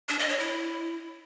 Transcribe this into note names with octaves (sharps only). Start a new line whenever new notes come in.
D4
D#5
C#5
E4